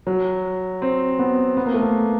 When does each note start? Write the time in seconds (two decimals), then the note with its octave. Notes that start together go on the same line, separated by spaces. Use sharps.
0.07 F#3
0.82 C4
1.19 B3
1.57 B3
1.66 A#3
1.74 A3
1.82 A#3